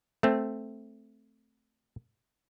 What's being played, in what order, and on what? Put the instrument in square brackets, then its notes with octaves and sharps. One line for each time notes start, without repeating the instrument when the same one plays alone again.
[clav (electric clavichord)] A3 C4